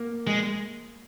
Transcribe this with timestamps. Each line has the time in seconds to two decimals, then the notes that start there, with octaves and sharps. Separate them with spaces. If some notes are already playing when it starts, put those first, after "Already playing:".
Already playing: A#3
0.27 G#3